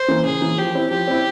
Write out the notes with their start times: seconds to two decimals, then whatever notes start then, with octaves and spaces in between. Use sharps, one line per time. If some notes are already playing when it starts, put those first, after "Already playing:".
Already playing: C5
0.08 E3 A#3
0.25 C#3 G#4
0.41 E3 A#3
0.58 F3 G4
0.75 C4 E4
0.91 F3 G4
1.07 C4 E4